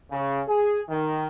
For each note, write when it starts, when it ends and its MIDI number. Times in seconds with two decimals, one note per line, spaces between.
0.11 0.41 49
0.47 0.80 68
0.88 1.27 51